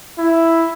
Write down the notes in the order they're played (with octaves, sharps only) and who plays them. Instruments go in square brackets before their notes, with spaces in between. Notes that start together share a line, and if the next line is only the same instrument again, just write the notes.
[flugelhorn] E4